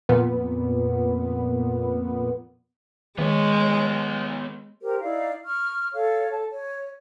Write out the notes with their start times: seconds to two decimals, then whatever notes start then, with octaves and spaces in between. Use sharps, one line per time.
0.09 F2 A#2 B3
3.18 D#3 G#3 B3 C#5
4.82 G4 A#4 C5
5.02 D#4 E4 D5 F5
5.45 C#6 F6
5.94 A4 C#5 F5
6.31 A4 A5
6.49 C#5